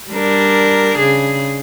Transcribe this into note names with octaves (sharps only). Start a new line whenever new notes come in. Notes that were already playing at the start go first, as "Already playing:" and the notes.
G3 D4 A#4
C#3 G#4